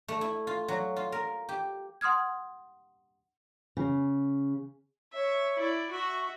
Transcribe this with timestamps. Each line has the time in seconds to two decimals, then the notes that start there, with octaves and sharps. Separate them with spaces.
0.08 A3
0.21 E4
0.47 F4
0.68 F#3
0.96 F4
1.12 A#4
1.49 G4
2.01 F#5 C6 D#6 F6 G#6
3.77 C#3
5.13 C#5 E5
5.57 E4 D5
5.91 F#4 E5 C#6